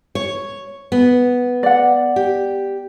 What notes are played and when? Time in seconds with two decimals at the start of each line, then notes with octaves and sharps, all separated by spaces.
0.15 C#5
0.92 B3
1.63 D5 F#5
2.16 G4